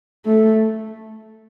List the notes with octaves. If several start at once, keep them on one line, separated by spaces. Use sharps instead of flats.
A3